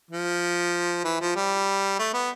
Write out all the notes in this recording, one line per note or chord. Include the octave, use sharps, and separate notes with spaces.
F3
E3
F3
G3
A3
B3